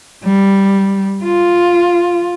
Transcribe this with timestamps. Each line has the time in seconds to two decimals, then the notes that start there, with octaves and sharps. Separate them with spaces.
0.24 G3
1.23 F4